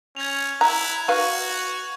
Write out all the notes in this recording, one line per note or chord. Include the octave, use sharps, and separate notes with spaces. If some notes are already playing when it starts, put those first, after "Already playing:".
C#4 G#6 F7
E4 A#5 F#6
D#4 F#4 B4 F5 C#6 D#7